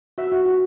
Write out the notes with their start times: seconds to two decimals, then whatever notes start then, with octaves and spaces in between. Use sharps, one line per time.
0.18 F#4 E5
0.32 F#4
0.46 F#4